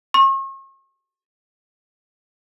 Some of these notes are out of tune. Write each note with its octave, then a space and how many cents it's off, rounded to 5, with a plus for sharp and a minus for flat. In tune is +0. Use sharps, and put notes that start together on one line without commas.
C#6 -40